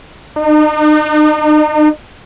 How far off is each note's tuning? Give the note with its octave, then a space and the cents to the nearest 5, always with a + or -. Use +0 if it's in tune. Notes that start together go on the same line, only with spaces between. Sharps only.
D#4 -40